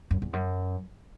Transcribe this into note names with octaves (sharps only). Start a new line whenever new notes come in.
F#2
E2
F#2